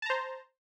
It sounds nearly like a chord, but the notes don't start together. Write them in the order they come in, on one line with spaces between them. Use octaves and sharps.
A5 A#5 C5